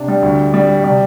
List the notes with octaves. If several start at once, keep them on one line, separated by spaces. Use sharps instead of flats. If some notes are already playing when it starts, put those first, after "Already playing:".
Already playing: C3 D4
G3
D2 D3
G3
C3 G3